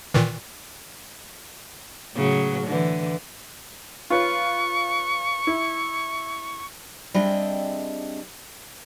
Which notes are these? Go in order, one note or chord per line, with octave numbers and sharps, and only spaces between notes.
A#2 D#3 E3
A2 C#3 F#3
D3 E3
F4 B4 C#5 C#6
E4
G3 C4 D4 G#4 D#5 E5